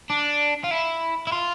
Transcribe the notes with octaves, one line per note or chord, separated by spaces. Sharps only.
D4
F4
E4
E4
F4